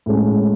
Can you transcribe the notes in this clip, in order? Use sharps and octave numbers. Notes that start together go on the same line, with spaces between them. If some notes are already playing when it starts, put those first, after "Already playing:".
A2 G#3 C#4